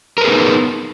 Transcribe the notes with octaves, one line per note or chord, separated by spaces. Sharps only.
B3 D#4 G#4 A#4 B4